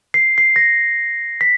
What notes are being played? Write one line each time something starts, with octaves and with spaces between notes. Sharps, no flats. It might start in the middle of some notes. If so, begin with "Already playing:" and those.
C7
C7
A#6
B6